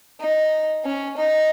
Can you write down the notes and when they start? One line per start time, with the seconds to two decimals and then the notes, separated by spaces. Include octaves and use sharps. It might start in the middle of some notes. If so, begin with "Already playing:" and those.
0.20 D#4
0.85 C#4
1.17 D#4